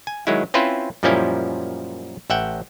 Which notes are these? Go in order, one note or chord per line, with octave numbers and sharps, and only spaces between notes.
G#5
D#3 F#3 G#3 E4
C4 C#4 E4 F4 B4 C5
F#2 A#2 F3 G3 C#4 E4
A1 E5 F#5 G5